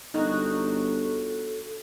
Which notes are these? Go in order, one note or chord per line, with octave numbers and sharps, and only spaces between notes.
G1 F#3 D#4 F#4 A4